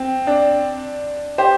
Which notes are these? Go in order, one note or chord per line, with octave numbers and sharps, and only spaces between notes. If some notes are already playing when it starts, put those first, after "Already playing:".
Already playing: C4
D4
G4 C5